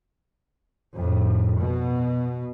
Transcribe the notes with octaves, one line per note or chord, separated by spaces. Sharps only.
F2 A2
B2